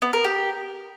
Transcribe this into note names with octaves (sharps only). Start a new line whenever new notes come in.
B3
A#4
G4